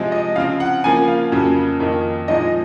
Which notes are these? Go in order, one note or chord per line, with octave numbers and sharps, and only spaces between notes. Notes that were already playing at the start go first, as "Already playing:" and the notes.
Already playing: C3 F3 G#3
D#5
C#3 F3 C4 F5
F#5
C#3 F3 A#3 G#5
F5
F2 C#3 F#3 A#3
F2 D#3 A#3 D#4
A#2 F3 G#3 C4 D#4 D#5